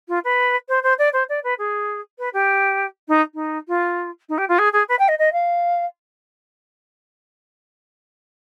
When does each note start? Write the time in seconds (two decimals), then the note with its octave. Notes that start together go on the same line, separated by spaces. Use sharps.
0.08 F4
0.24 B4
0.69 C5
0.83 C5
0.99 D5
1.13 C5
1.29 D5
1.44 B4
1.58 G#4
2.18 B4
2.33 G4
3.08 D#4
3.34 D#4
3.68 F4
4.29 D#4
4.38 G4
4.48 F4
4.58 G#4
4.73 G#4
4.88 B4
4.99 G5
5.08 D#5
5.19 D#5
5.33 F5